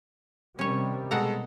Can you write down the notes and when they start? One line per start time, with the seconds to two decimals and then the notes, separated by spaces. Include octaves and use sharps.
0.59 C3 D#3 G3 C#4 C#5
1.11 B2 G#3 A4 F#5 A#5